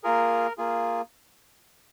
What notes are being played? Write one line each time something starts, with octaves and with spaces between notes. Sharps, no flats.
A#3 F4 G#4 A#4
A#3 F4 G#4